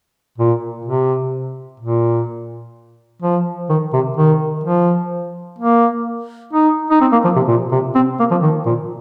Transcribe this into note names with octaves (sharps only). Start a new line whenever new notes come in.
A#2
C3
A#2
F3
D#3
C3
D#3
F3
A#3
D#4
D#4
C4
A#3
F3
C3
A#2
C3
C4
A#3
F3
D#3
A#2